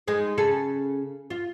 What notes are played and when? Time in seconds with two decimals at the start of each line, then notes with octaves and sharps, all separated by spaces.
0.07 G#3 D#4 G#4
0.38 C#3 G#4 A4
1.30 F4